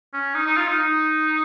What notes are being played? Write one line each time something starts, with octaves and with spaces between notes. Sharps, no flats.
C#4
D#4
D#4
F4
D#4
D#4